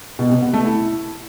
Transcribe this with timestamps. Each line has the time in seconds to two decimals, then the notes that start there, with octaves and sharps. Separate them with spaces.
0.19 B2
0.30 C3
0.42 B3
0.53 A3
0.65 E4